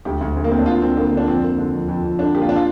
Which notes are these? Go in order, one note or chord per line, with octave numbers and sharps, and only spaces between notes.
D2 G4
D2
D2
A#3
D2 C4
D4
D3 F4
D2 C4
D3 A#3
D3
D4
F2 C4
A#3
D3
F2
F2
F2
D3 D4
A#3 G4
F4
D4
F4